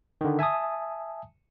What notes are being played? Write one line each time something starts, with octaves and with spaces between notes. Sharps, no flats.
D3 D#3
E5 G#5 A5 D#6